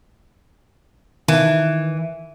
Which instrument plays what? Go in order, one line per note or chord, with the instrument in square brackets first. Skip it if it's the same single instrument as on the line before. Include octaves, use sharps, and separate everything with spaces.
[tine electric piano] D#3 [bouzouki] E3